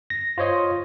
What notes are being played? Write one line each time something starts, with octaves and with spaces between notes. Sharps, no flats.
A#6
F4 C5 C#5 D#5